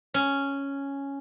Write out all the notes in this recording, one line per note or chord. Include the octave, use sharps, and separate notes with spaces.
C#4